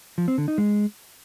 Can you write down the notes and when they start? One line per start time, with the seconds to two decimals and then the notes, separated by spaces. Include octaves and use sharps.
0.18 F3
0.28 C4
0.38 D3
0.48 D#4
0.58 G#3